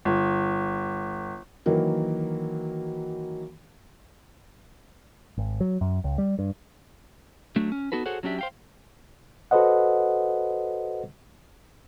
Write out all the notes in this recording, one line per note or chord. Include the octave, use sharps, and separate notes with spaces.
G1
D#3 E3 F#3 A#3
G#1
F#3
F#2
C#2
G3
G2
F#3 A3 D4
C#4
B3 D#4 F#4 A4 B4
F#4 G#4 A4 C5 C#5 F#5
F#3 C#4 D4 G4 E5
C5 F5 G5
F#4 A4 B4 C5 D#5 F#5